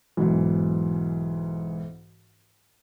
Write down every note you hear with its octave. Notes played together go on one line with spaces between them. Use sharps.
B1 G#2 E3